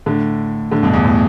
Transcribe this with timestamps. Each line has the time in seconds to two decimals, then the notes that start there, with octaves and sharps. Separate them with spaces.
0.06 A2 D3
0.71 A2 D3
0.83 G2 B2
0.93 E2
1.05 A2